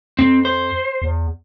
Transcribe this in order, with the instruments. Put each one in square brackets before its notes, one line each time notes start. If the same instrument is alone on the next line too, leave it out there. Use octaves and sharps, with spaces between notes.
[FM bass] F2 [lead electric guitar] C4
[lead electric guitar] C5
[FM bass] E2